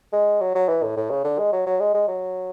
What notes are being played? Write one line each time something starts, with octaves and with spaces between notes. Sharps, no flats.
G#3
F#3
F#3
E3
A2
A2
C#3
D3
G#3
F#3
F#3
G#3
G#3
F#3